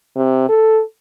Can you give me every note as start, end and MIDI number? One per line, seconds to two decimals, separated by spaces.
0.16 0.46 48
0.49 0.81 69